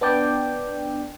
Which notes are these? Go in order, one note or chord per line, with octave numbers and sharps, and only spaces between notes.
B3 D4 D5 G5